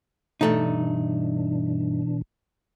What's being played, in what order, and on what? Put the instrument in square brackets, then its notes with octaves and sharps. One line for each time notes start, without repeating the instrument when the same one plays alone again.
[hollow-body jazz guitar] G2 A3 D#4 [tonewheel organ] B2 E3 D4